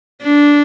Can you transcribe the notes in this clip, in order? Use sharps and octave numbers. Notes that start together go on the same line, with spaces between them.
D4